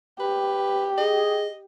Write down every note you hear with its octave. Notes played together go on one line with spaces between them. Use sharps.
G4 B4
G#4 D#5